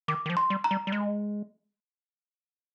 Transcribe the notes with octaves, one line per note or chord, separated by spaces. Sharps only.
D#3 D6
D#3
F3
C6
G3
A#5
G3
G3
G#3